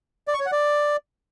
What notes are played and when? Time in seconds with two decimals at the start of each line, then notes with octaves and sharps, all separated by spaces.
0.28 D5
0.34 C#6
0.40 C#5
0.46 F#5
0.52 D5